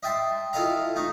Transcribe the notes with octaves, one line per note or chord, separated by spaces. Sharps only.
D#5 E5 G5 A5 C6
E4 F4 A4 D#5 F5 A#5
A3 D#4